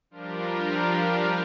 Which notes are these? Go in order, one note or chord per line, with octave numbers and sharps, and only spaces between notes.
F3 G3 D4 F4 G4 A#4